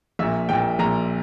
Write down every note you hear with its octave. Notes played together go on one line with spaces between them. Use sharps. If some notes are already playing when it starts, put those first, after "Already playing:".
A#1 A#2 E5
A#1 A#2 G5
A#1 A#2 A#5